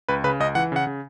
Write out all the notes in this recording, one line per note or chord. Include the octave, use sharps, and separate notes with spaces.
C#2 B4
C#3 B4
C#2 D#5
E3 F#5
C#3 F#5
C#3